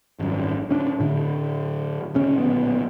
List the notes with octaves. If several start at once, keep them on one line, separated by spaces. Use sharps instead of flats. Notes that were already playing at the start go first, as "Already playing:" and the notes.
G#1 F#2
D1 C#4 D4
A2 D3
E1 C#3 C#4
D1 A#1 B3